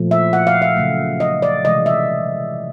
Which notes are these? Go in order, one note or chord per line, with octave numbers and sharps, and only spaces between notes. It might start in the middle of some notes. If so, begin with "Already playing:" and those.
Already playing: A#2 F3 A3
E5
F#5
F5
E5
C#3 F#3 A3
D#5
D5
C3 E3 G#3 D#5
E5